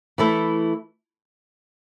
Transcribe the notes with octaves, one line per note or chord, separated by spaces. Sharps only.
E3 A3 E4 A4